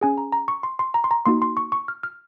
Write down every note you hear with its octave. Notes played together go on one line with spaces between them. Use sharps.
C#4 G#4 G#5
A#5
A#5
C#6
C6
C6
A#5
C6
A#5
A#3 D#4 F#4 C6
C6
C#6
C#6
F6
F6